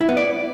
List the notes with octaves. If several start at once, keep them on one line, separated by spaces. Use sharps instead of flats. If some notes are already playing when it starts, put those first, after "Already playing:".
E4
B3
D5